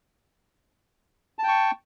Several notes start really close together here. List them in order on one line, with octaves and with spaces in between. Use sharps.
A5 G5 C#6